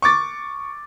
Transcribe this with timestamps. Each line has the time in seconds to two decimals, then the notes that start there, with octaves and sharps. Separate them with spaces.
0.02 C#6 D6 A6